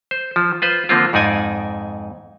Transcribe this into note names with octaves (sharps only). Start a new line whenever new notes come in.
C5
F3
F4 B4 C5
D3 F3 A#3 C4 F4
F2 G#2 D#4 D5 G#5